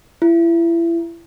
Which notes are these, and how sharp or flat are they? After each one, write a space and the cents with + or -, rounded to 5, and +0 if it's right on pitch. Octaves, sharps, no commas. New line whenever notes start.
E4 +30